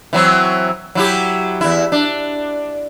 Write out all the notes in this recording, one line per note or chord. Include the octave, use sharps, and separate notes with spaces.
E3 F#3 C4
F#3 E4 G4
E2 E4
D4